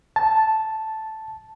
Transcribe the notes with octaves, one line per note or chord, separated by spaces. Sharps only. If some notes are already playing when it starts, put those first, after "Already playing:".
A5